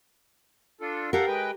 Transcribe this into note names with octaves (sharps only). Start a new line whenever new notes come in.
D4 F4 A4
G4 A4 A#4 F5 F#5
G#3 B4 G5